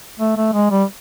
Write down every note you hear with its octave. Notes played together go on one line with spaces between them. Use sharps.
A3
A3
G#3
G3